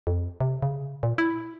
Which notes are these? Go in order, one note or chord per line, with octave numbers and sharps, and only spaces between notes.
F2
C3
C#3
A#2
E4